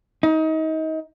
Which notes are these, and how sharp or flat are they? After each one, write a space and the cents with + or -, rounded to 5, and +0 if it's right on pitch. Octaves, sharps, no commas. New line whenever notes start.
D#4 +30